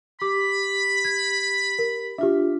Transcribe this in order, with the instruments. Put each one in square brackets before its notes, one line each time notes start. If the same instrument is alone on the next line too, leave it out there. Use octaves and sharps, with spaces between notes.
[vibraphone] G4 [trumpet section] B5 [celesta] D6
[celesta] G#6
A#4
[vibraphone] D4 F4 [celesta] G4 E5